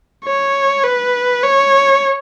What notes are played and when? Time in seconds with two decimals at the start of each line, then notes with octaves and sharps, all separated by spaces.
0.25 C#5
0.84 B4
1.43 C#5